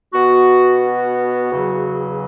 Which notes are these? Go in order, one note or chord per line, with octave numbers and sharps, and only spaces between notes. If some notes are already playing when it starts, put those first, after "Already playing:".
B2 B3 F#4
F#4
E2 C#3 F#3